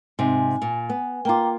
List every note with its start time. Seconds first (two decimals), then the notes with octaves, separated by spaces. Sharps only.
0.19 G#2 C3 G#5
0.62 A#2
0.90 B3
1.25 A#3 F4 G5 A#5 D6